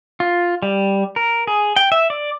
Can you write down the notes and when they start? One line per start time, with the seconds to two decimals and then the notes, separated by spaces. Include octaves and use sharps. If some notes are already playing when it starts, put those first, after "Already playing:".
0.20 F4
0.63 G3
1.16 A#4
1.47 G#4
1.76 G5
1.92 E5
2.10 D5